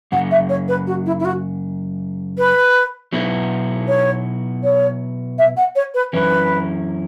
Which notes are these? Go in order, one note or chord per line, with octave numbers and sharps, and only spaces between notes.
F#2 C#3 F#3 F#5
E5
C#5
B4
F#4
E4
E4
F#4
B4
B2 F#3 B3 E4
C#5
C#5
E5
F#5
C#5
B4
F#2 E3 C#4 E4 B4